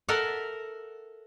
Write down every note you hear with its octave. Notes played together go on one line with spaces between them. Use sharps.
A4 A#4 E5 F#5